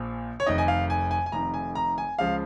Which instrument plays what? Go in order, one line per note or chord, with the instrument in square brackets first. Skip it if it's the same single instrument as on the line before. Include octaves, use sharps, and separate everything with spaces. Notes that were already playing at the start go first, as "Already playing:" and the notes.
Already playing: [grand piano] A#1 A#2 F3
C#5
F1 F2 D#3 D#5
G#5
F5
G#5
G#5
G#5
F1 F2 D#3 A#5
G#5
A#5
G#5
C#2 C#3 F3 F5